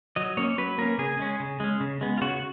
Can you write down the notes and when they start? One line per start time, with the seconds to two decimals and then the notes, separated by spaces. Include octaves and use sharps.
0.16 F#3 D#5
0.37 A#3 C#4 C#5
0.58 F#3 B4
0.78 A#3 C#4 A#4
0.98 C#3 G#4
1.19 G#3 C#4
1.40 C#3
1.60 G#3 C#4
1.80 C#3
2.01 G#3 B3
2.17 F4
2.21 C#3 F#4